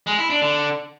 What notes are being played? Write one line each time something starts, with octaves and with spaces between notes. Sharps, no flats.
G#3
E4
D4
D3